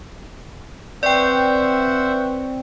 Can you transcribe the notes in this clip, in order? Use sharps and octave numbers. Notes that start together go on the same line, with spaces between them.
C4 B4 C5 D5 E5 F#5 G5 C#6